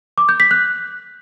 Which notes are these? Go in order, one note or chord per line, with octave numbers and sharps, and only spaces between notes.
D6
G6
B6
F#6